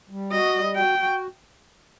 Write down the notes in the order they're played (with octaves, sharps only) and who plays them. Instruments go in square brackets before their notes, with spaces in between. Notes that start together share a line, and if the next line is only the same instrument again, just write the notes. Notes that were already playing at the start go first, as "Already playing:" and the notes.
[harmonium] G3
[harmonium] F#4 [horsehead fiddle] D#5
[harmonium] G3
[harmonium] F#4 [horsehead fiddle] G5
[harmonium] F#4